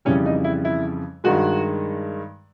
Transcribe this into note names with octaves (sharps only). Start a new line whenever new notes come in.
F2 C#3 E3 G3 C#4
D#4
E4
E4
G2 D#3 G#3 F#4